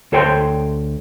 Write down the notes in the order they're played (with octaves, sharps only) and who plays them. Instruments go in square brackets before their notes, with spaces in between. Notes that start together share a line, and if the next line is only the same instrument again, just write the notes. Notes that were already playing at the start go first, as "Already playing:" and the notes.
[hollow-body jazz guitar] D2 A4 C5 C#5 G5